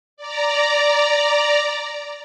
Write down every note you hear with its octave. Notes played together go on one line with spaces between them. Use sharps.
D5 A#5